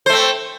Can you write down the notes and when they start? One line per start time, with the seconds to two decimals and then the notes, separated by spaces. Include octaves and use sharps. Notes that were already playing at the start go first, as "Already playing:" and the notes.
0.06 C5
0.09 A3
0.13 C4